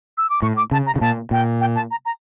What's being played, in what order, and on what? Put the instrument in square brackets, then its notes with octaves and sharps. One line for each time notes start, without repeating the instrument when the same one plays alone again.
[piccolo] E6
D6
[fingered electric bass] A2 [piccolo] C#6
[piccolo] D6
[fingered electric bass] C#3 [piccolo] A5
[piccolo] A#5
[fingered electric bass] C#3
[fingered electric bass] A#2 [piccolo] A5
[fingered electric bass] A#2 [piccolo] G5
[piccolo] G5
A5
A#5
A#5